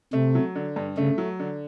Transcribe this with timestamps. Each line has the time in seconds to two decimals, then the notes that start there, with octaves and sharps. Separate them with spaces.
0.13 C3 A3
0.35 F#3
0.55 D3
0.76 G2
0.97 C#3 A3
1.18 F#3
1.39 D3